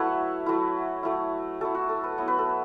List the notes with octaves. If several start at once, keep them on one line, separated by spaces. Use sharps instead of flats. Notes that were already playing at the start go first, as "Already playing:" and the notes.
Already playing: F#3 A3 E4 B4 C#5 E5 F#5 A5
F#3 A3 E4
F#3 A3 E4
F#3 A3 E4 A4
F#4
A4
B4
F#3 B3 E4 C#5
B4
A4
B4